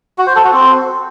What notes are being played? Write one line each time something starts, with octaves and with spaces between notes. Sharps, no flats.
F#4
C5
A4
F#4
C4